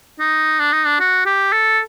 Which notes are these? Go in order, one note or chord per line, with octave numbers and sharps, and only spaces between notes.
D#4
D4
D#4
D4
F#4
G4
A4